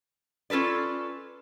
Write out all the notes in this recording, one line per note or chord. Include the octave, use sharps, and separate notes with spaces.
C#4 F4 A4 B4 D5